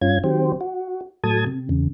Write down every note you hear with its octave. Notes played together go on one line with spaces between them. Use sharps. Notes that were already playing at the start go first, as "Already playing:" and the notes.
G2 C#4 F4 G#6
D#3 F#3 C4 G4 C5
F#4
A2 F#3 A4 A5 D#6 G#6
C3
E2 C#3